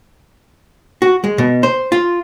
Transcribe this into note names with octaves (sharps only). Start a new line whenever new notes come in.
F#4
G#3
B2
C5
F4